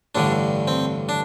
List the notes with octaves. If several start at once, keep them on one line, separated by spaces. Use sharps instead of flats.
A1 G2 D3 D4
C4
D4